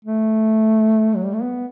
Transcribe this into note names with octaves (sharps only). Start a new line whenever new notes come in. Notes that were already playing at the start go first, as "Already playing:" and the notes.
A3
F#3
G3
A3
B3